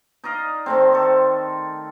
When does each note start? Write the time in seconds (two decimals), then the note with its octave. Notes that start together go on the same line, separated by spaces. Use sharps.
0.24 D#4 D5 D#5 F5
0.66 D#3 A3 C4
0.93 A4 C5